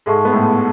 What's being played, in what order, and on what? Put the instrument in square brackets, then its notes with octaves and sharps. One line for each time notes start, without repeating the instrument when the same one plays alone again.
[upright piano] G#2 G#3 [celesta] A4 E5 A5 C#6
[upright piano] B3
A2 A3